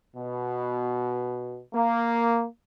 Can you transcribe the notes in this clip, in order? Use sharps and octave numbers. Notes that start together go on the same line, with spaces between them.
B2
A#3